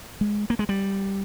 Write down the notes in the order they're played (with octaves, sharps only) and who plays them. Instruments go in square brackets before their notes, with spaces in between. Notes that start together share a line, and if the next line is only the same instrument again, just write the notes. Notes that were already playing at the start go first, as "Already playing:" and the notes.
[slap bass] G#3
A#3
G#3
G3